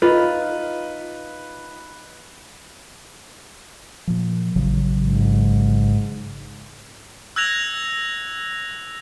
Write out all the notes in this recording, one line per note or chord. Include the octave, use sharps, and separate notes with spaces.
D#4 F4 B4
A#2 F3
A1 C#3 F#3
G#2
E6 F#6 G#6 A#6 F7